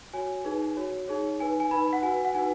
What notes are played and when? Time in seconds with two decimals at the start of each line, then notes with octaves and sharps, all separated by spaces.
0.13 F#4 C#5 G#5
0.45 D#4 G#4 B4
0.77 F#4 C#5
1.08 D#4 G#4 C#5
1.39 D#4 B4 G#5
1.60 G#5
1.71 D#4 B4 B5
1.93 F#5
2.03 F#4 B4 G#5
2.25 F#5
2.34 D#4 F#4 B4 G#5